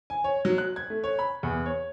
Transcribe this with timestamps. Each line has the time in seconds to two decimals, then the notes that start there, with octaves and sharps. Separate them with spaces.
0.10 G#5
0.24 C#5
0.45 F#3
0.58 F#6
0.76 G#6
0.90 A3
1.04 C#5
1.19 B5
1.43 E2
1.66 C#5